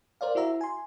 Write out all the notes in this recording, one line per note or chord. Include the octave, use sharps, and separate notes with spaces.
A#4 C5 D5 F5
E4 F#4 E5 A#5
G#5 C6